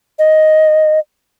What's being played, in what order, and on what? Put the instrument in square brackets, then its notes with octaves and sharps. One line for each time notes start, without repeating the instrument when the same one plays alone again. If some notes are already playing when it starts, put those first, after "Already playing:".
[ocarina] D#5